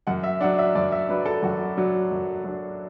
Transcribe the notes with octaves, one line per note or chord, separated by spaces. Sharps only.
F#2 F#5
E5
F#3 D4 F#5
E5
F#2 D5
E5
F#3 D4 B4
A4
F#2 F#4
F#3 D4
F#2
F#3 D4